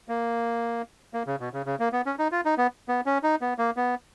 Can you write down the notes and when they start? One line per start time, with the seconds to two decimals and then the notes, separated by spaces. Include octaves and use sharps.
0.09 A#3
1.14 A#3
1.27 C#3
1.40 B2
1.53 C#3
1.66 C#3
1.80 A#3
1.92 B3
2.06 C#4
2.19 D#4
2.32 F4
2.45 D#4
2.58 B3
2.89 B3
3.06 C#4
3.23 D#4
3.41 B3
3.58 A#3
3.76 B3